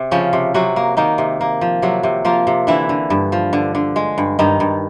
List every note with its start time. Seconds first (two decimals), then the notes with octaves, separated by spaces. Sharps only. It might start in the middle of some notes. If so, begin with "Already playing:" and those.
Already playing: C3
0.11 C#3 F3 C#4
0.33 C3
0.54 C3 F#3 F#4
0.76 A#3
0.97 D#3 A#3 D#4
1.18 C3
1.41 A#3
1.61 F3
1.82 C3 F#3 F#4
2.03 C3
2.25 F3 A#3 F4
2.47 C3
2.67 D3 E3 E4
2.89 D3
3.10 G2
3.32 F3
3.53 D3
3.75 D3
3.96 G#3
4.18 G2
4.39 G2 D#3 D#4
4.60 G2